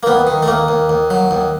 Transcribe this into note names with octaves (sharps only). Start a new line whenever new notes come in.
A#3
D#2 B3
D#3
A3
D#2 A#3
D#2
D#2
F#3
D#2